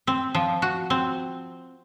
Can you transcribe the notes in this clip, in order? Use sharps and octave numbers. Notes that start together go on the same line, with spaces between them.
C4
F3
F#4
C4